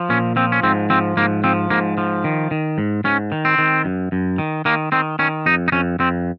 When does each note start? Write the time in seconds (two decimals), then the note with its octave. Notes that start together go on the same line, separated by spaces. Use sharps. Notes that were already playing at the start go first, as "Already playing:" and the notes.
Already playing: F3
0.09 A#2 C#4
0.36 F3 C4
0.52 C#4
0.63 G#2 C4
0.90 F3 C4
1.17 G#2 A#3
1.44 F3 C4
1.70 G#2 A#3
1.98 F3
2.24 D#3
2.51 D#3
2.78 G#2
3.04 G#2 C#4
3.32 D#3
3.45 C4
3.58 D#3
3.85 F#2
4.12 F#2
4.38 D#3
4.65 D#3 A#3
4.92 D#3 C4
5.19 D#3 C#4
5.46 F2 D#4
5.68 D#4
5.72 F2 C#4
6.00 F2 C4